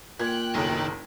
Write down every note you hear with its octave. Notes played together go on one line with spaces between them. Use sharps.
A#2 G5 F#6 G#6
F#1 B1 D#3